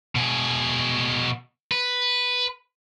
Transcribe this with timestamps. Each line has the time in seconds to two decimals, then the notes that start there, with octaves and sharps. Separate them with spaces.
0.15 B2 G#4
1.72 B4